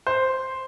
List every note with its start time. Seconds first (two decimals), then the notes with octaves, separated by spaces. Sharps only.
0.07 C5